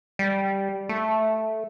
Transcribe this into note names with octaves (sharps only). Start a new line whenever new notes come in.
G3
A3